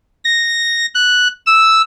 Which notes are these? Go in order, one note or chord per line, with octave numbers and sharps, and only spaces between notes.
A#6
F#6
E6